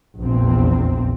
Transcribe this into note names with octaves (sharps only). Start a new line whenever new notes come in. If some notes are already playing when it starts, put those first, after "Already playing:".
F1 A#1 E2 A#2 C4